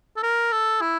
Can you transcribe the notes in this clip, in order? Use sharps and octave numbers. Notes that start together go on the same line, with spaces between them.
A4
A#4
A4
E4